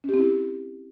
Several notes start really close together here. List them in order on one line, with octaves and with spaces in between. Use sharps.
C#4 G4 C4 E4